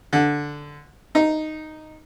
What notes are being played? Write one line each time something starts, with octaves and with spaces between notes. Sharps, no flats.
D3
D#4